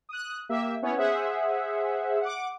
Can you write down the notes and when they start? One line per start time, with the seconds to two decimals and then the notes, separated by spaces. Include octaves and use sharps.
0.09 D#6 F#6
0.49 A#3 G4 E5
0.82 B3 C#4 E4 C#5
0.97 G#4 C5 E5 F#5
2.21 F#5 D6